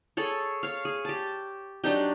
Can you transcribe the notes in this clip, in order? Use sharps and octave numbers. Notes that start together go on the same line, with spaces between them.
G#4 A4 C#5
C#5 F5
G#4
G4 A5
F#3 D4 D#4 G4